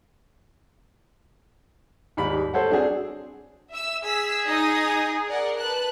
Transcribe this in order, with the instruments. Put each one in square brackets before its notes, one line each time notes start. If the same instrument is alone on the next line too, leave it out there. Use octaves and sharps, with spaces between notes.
[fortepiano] D#2 G#2 G3 B5
A4 C5 C#5 F#5
C4 D4 F#4 G#4
[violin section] E5 E6
[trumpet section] G#4 [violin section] E6 B6
[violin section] D#4 D#6 A#6
A#4 D5 F#5
B4 A5 F#6